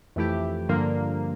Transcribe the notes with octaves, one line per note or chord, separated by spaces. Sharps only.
F2 E3 A3 E4 G4
G2 D3 F3 A#3